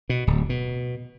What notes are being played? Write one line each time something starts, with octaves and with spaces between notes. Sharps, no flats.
B2
D1
B2